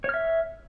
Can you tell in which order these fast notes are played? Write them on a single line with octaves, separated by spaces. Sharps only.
C#5 F6 E5